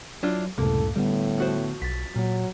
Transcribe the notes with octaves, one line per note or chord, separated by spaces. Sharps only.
F#3 D4 E4 F4
C#2 F#2 A2 C3 A#3 A4
A2 D3 G3 B3
F3 F#4 C5
B1 A6 B6
A#2 F#3